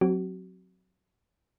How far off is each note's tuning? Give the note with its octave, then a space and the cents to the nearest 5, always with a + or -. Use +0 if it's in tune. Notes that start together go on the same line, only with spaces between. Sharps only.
F#3 -10 C4 +5 F#4 +30